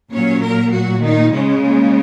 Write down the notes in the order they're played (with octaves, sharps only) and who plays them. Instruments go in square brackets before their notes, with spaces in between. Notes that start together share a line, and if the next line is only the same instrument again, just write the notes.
[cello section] A#2 F#3 C#4 C#5
A#3 A#4
F#3 F#4
D#3 D#4
C#3 G#3 C#4
A#3